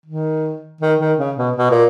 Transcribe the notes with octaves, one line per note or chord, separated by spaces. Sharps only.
D#3
D#3
D#3
C#3
B2
B2
A#2